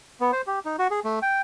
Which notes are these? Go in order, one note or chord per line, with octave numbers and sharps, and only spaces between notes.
B3
C5
G4
D#4
F#4
G#4
A3
G5